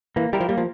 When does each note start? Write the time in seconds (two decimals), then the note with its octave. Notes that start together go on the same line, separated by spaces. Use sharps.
0.16 E3 A#3
0.33 G3 E4 G4 A#4
0.41 F3
0.49 G3 A#3
0.58 F3